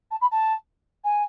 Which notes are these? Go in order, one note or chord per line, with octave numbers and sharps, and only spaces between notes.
A5
B5
A5
G#5